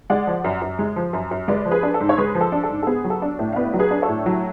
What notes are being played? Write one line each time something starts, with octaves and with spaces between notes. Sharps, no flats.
G#3 D5 F#5
F3
F#2
F#2
G#3
F3
F#2
F#2
G#3 B4 D5
F3
G#4 B4
D4
A4
G#2
C#5
G#3 G#4 B4
F3
A4
D4
A4
G#2
A4
B3 G#4
F#3
A4
D4
A2
F5
B3 B4 D5
F#3
G#4 B4
D4
A4 C#5
A2
F#3